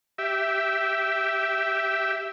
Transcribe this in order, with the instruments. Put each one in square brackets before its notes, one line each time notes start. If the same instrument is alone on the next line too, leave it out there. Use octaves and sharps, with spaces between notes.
[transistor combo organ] G4 E5